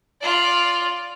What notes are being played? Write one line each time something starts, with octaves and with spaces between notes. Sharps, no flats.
F4 D5